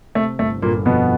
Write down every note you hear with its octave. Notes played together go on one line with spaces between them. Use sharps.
C3 A3
G1 A3
G1 A#2 A#3
F2 B2 B3